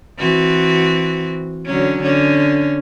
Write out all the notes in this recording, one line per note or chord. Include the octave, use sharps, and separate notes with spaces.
E3 C4 F#4
D3 F#3 C#4
D3 C#4